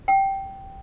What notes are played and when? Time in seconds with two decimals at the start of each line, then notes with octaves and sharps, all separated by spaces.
0.08 G5